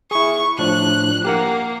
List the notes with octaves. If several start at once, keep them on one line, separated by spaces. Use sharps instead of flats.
E4 G#4 C#6
A2 F3 D4 F#6
A#3 G4 A#4 F#5